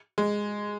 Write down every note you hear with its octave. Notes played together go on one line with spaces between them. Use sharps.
G#3